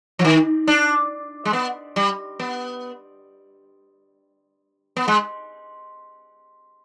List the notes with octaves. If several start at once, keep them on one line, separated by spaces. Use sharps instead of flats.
F3
D#3
D4
G#3
B3
G3
B3
B3
G#3